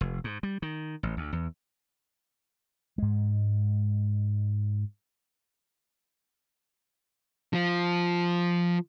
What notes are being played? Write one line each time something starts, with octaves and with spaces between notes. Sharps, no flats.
F1
G#2
G3
D#3
A1
D2
E2
G#2 G#3
F3 F4